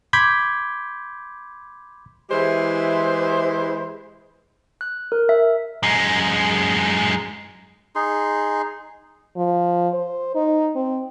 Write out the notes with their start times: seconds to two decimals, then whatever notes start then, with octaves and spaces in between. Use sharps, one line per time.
0.13 B5 C6 D6 G6 G#6 B6
2.30 E3 G#3 E4 G4 C5
4.81 F#6
5.12 A#4
5.29 E5
5.83 F#2 G#3
7.95 D#4 G#4 C6
9.36 F3
9.94 C5
10.35 D#4
10.76 C4